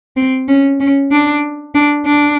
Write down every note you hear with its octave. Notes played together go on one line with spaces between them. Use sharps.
C4
C#4
C#4
D4
D4
D4